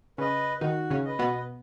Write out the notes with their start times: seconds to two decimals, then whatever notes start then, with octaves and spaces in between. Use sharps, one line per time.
0.18 C#3 C#4 B4 D#5
0.61 D#3 D#4 F#4
0.91 C#3 C#4
1.05 B4 D#5
1.19 B2 B3